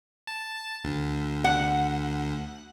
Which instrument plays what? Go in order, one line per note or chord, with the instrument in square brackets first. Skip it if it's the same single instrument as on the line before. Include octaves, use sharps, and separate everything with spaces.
[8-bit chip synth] A5
D2
[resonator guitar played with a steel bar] F#5